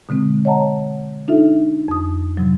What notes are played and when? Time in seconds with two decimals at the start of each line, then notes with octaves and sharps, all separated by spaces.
0.09 B2 D3 G#3 C4
0.45 C#5 D#5 F#5 A5 A#5
1.28 D4 D#4 F4 A4 E5
1.88 F2 D#6
2.37 G#2 C3 F3 F#3